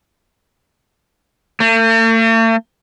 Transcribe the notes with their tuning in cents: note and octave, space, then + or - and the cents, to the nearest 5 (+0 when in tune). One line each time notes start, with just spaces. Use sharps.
A3 +45